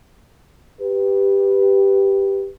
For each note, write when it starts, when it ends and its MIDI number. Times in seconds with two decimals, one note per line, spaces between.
0.81 2.47 67
0.81 2.47 71